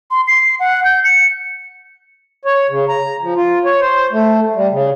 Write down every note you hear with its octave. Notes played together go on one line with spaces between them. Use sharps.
C6
C7
F#5
G6
C#7
C#5
C#3
A#5
F3
F4
C#5
C5
A3
G3
C#3